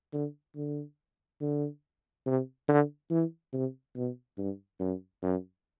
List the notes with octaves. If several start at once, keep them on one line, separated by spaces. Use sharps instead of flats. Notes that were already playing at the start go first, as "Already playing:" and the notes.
D3
D3
D3
C3
D3
E3
C3
B2
G2
F#2
F#2